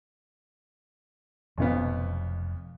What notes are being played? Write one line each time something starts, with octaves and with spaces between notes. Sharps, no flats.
F1 B1 F2 B3